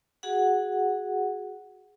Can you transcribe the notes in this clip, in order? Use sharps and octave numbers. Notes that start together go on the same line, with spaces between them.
F#4 G#4 F#5